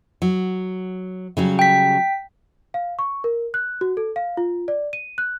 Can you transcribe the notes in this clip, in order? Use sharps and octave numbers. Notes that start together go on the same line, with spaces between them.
F#3
C#3 F#3 G3
G5 B6
F5
C#6
A#4
F#6
F#4
A4
F5
F4
D5
D#7
F#6